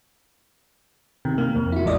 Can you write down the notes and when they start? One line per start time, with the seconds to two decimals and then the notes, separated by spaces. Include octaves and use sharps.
1.25 C3 D#3
1.38 A#3
1.55 F2
1.72 E4 F#4
1.84 A1 E2 F3 G#3 D5 D#5